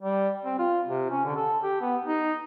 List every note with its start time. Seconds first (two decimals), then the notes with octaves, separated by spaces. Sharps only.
0.01 G3
0.45 C4
0.59 F4
0.87 C3
1.10 C#4
1.25 D3
1.36 A4
1.63 G4
1.81 B3
2.05 D#4